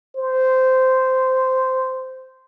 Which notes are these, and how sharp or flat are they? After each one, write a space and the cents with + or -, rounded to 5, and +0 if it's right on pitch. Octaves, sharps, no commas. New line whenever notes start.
C5 -10